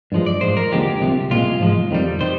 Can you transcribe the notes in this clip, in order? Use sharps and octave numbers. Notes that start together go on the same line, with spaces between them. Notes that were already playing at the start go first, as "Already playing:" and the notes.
G2 F3 G#3
D5
G#2 F3 G#3 C5
A#4
D#2 D3 F3 G#3 G4
C2 C3 F3
C2 A#2 G#3 F4
G#2 F3 G#3
F2 D#3 G3
D#3 G3 C5